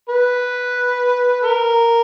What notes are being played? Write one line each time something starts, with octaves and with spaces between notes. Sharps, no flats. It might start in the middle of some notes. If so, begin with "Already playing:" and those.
B4
A#4